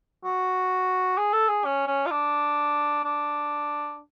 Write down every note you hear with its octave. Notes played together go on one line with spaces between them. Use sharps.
F#4
G#4
A4
G#4
C#4
C#4
F4
D4
D4